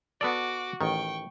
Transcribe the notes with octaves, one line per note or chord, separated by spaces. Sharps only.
B3 F#4 A4 D5 D6
A1 D#3 G5 C#6